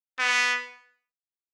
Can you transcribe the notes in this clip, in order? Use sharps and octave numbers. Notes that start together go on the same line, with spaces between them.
B3